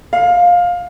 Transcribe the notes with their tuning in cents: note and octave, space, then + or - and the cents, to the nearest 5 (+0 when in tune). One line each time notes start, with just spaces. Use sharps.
F5 +15